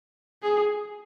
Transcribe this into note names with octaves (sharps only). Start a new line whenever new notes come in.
G#4